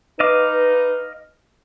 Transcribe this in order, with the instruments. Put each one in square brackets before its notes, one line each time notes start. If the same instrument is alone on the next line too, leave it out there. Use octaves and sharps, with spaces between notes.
[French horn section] D#4 B4 [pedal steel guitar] D#5 F5 D6